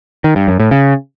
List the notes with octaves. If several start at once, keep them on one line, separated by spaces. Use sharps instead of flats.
D#3
G2
F#2
A2
C#3